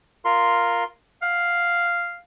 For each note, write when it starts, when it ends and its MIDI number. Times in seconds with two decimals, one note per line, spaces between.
0.25 0.84 65
0.25 0.84 70
0.25 0.84 84
1.22 2.20 77
1.22 1.86 78